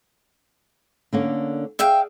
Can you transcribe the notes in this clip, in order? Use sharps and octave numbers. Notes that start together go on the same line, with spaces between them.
D3 A#3 C#4
G#4 D5 E5 F5 G5